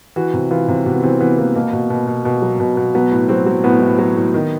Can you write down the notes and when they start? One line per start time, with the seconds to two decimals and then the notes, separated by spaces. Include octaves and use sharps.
0.16 E3 F#4
0.34 C3
0.51 E3 F4
0.68 C3
0.85 C3 F#4
0.95 B3
1.03 E3 C4
1.20 E3 B3
1.38 E3 A#3
1.55 B2 A#3
1.73 B2
1.90 B2
2.07 B2
2.25 B2
2.42 F#3
2.60 B2
2.77 B2
2.95 F#3 B3
3.11 A2
3.29 F#3 C4
3.46 F#3
3.64 A2 B3
3.81 A2
3.99 F#3
4.16 A2
4.34 D#3